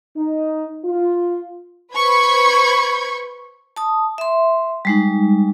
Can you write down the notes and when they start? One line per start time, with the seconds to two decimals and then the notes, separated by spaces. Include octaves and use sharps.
0.17 D#4
0.84 F4
1.93 B4 C5 B5 C#6 G#6
3.77 A5 D#6
4.18 E5 C6
4.85 G3 G#3 D#4